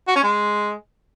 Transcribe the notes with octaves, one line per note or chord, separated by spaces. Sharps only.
F#4
C#4
G#3